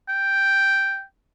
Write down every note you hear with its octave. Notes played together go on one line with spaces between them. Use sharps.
G5